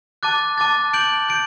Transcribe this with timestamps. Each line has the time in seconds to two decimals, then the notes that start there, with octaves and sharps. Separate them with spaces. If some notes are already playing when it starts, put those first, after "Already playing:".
0.23 A5 D6 F#6 A6
0.58 A5 D6 F#6 A6
0.93 G6 D7 F#7
1.28 G6 D7